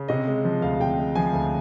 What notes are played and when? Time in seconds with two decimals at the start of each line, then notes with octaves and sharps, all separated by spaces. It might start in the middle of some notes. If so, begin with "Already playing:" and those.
Already playing: C#3
0.08 C3 D#5
0.27 G#3
0.45 F3
0.62 D2 F5
0.80 C3 G5
0.98 G#3
1.15 F3 G#5
1.33 D2